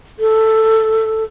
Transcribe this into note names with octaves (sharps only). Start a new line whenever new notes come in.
A4